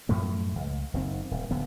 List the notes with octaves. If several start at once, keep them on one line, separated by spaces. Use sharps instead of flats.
F#2 A2 F3 A3
C#2
F#1 D#3 C4
D#1
D1 D3 B3